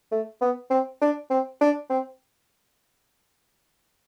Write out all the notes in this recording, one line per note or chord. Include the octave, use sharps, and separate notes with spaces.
A3
B3
C4
D4
C4
D4
C4